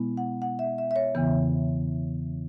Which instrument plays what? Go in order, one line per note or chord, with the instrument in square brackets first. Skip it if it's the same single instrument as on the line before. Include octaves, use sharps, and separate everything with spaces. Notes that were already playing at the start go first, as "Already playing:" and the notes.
Already playing: [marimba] B2 G#3 B3 E4
F#5
F#5
E5
E5
E5
C#5
E2 C#3 E3 B3